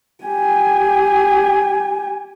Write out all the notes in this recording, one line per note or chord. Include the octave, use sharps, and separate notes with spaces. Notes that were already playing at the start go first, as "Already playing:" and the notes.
G4 G#5